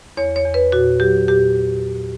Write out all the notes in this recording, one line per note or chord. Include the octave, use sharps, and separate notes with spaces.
E2 C#5
C#5
E2
B4
A#2 F#4
F#3 G4
A#2 G4